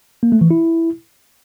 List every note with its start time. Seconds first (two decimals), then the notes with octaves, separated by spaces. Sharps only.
0.23 A#3
0.32 A3
0.41 E3
0.51 E4